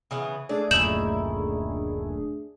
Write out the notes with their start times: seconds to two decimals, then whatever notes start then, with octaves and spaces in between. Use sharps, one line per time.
0.11 C#3 E3 B3
0.49 A3 D4 G#4 D5
0.71 D1 F#2 A#2 D#3 E4 G6 E7 F#7